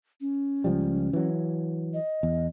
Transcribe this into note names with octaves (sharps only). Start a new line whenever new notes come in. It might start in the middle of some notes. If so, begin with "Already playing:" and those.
C#4
C#2 F3 G3
E3 F#3
D#5
E2